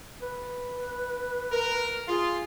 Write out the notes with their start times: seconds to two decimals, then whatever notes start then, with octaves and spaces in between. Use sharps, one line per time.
0.22 B4
1.52 A#4
2.07 F4 G#4